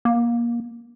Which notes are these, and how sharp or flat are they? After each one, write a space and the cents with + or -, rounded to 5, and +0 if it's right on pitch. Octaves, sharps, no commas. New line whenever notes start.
A#3 +25